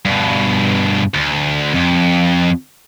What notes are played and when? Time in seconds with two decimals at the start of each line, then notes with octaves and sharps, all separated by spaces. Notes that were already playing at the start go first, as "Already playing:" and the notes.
0.05 G2 B2
1.14 D2
1.74 F2